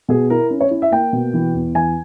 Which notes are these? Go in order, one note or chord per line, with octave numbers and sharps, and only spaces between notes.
B2 G#4
E4 A#4
C#4
C#5
E4
E5
A#3 G5
B2
E3
E2
E3 G#5